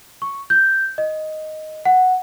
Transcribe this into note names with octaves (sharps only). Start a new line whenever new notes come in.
C#6
G6
D#5
F#5